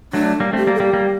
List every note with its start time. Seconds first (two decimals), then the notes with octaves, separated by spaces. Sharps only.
0.13 F#3 A3 D4
0.40 G3 A#3
0.53 A3 C4
0.58 G4
0.67 G3 A#3
0.75 A4
0.79 G3 A#3 G4
0.93 G3 A#3